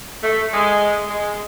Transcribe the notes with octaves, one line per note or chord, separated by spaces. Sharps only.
A3
G#3
G#3